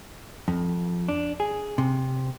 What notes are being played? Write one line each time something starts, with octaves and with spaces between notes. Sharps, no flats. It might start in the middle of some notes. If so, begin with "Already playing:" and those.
F2
D4
G#4
C3